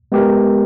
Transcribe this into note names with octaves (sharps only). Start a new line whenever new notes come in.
G#3 B3 G4 A#4